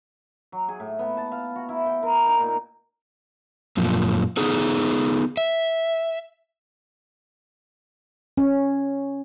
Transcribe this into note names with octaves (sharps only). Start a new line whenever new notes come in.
F#3
G#4
A2
B3
A5
F5
F#4
E4
G5
A#4
D#4
A#2
F#2 A#2 F3
B3 D#4 G#4 A4
E5
C#4